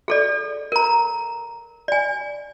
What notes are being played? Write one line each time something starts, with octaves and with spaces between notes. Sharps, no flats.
G#4 A4 D5
A#4 A#5
D5 G#5